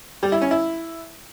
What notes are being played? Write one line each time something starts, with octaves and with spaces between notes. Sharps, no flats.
G3
E4
C#4
E4